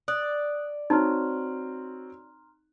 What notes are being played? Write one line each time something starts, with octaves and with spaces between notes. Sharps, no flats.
D5 D#6 F#6
C4 D#4 F#4 C#5 A#5 C6 F6